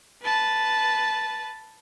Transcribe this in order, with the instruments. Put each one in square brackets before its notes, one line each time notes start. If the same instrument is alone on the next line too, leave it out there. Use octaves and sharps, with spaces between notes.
[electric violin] B4 A5